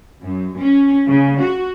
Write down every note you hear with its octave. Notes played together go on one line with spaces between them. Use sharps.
F#2
C#4
C#3
F#4